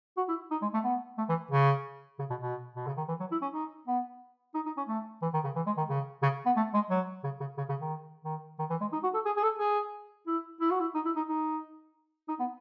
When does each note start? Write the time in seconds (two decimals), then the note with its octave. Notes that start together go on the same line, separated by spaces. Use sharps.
0.17 F#4
0.28 E4
0.51 D#4
0.62 G#3
0.74 A3
0.84 B3
1.18 A3
1.29 E3
1.51 C#3
2.19 C#3
2.30 B2
2.41 B2
2.75 B2
2.87 C#3
2.97 D#3
3.08 E3
3.20 F#3
3.31 E4
3.42 C#4
3.53 D#4
3.88 B3
4.54 D#4
4.66 D#4
4.77 C#4
4.88 A3
5.22 E3
5.34 D#3
5.44 C#3
5.56 E3
5.66 G#3
5.77 D#3
5.89 C#3
6.22 C#3
6.46 B3
6.56 A3
6.74 G#3
6.90 F#3
7.24 C#3
7.40 C#3
7.58 C#3
7.69 C#3
7.80 D#3
8.24 D#3
8.59 D#3
8.70 E3
8.81 G#3
8.92 D#4
9.03 F#4
9.14 A4
9.25 G#4
9.37 G#4
9.43 A4
9.59 G#4
10.27 E4
10.60 E4
10.71 F#4
10.80 E4
10.94 D#4
11.05 E4
11.16 D#4
11.28 D#4
12.28 D#4
12.40 B3